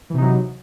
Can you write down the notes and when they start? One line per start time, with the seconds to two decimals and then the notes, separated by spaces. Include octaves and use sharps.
0.10 E3
0.14 C3
0.18 D#4
0.22 F#3